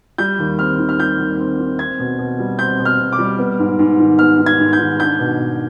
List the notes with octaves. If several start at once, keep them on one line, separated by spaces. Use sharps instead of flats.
G3 G6
D#2
C4 F6
D#3
F6
G3 G6
D#2
C4
D#3
C4 G#6
B2
B2
G3
C4 G6
B2
F6
B2
D6
G3
B3
G#2
G#2
D#3
B3 F6
G#2
G#6
G#2
G6
D#3
D4 G6
B2
B2